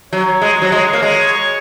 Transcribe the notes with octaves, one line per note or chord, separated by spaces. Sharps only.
F#3 C#5
G#3
F#3
G#3
A#3
G#3